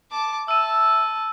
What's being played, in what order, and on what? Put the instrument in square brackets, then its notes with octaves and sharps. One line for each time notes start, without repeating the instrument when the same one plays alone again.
[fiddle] A5 D6
[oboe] E5 [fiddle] A5 [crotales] E6 D#7